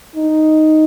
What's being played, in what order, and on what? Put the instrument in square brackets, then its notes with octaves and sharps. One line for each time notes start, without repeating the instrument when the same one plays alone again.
[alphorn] D#4